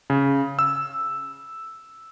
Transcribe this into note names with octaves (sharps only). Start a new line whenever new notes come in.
C#3
E6